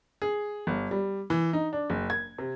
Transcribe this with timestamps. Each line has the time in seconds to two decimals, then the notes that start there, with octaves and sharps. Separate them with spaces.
0.22 G#4
0.67 G1
0.91 G3
1.30 E3
1.53 D#4
1.73 D4
1.90 F#1
2.10 G#6
2.39 C3